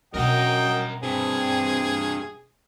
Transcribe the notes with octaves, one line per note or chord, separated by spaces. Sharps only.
F#2 B2 D4 A#4 D#5 F#5 G5
G2 C3 C4 G#4